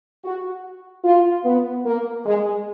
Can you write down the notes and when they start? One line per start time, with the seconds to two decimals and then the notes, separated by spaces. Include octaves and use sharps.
0.24 F#4
1.04 F4
1.45 B3
1.85 A#3
2.26 G#3